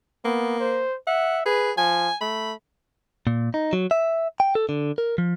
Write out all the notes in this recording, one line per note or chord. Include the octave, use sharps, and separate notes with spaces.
A#3 B3
C5
E5 F#5
G#4 B4
F3 G#5
A3 B5
A#2
D#4
F#3
E5
G5
A4
D3
A#4
F3